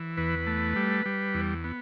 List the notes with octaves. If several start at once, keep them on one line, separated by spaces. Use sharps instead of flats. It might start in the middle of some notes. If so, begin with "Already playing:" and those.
Already playing: E3
E2 B4
A3
G3
G3
E2
B3